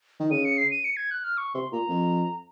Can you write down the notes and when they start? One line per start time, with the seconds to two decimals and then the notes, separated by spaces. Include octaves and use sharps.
0.20 D#3
0.31 C#3 D#7
0.45 C#7
0.58 C7
0.71 D#7
0.85 C#7
0.97 G#6
1.11 F#6
1.24 F6
1.37 C#6
1.54 C3 C6
1.72 A#2 A#5
1.89 F2